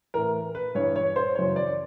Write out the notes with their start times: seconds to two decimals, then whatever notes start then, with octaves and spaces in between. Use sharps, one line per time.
0.14 A2 E3 A#4
0.55 B4
0.75 G2 E3 C#5
0.96 C#5
1.16 C5
1.35 F#2 C#3 E3 C#5
1.56 D5